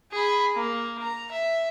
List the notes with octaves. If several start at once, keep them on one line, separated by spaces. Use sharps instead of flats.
G#4 B5
A#3
A#5
E5